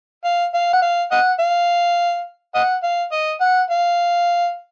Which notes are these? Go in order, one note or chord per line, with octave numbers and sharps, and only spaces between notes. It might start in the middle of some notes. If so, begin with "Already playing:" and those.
F5
F5
F#5
F5
D#5 F#5
F5
D#5 F#5
F5
D#5
F#5
F5